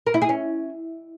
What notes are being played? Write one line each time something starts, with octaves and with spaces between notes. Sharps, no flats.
A#4
E4
G#4
C#4